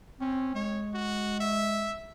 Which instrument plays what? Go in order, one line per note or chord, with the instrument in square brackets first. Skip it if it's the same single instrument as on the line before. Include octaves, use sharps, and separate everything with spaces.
[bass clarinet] C4 [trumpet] C#4
[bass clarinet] G#3 [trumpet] C#5
[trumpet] F#4
E5